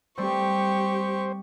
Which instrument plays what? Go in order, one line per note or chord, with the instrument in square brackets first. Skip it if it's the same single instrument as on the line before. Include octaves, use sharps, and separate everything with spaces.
[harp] G3 A3 C4 [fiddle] G4 C#6 [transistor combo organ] C5